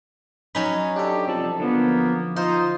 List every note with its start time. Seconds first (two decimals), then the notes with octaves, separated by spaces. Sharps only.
0.55 F#3 C#4 D#4 G#5 B5
0.96 D4 G4 A4
1.28 C3 F3 G3 A4
1.60 D3 F3 A#3 B3
2.36 D#4 F4 C5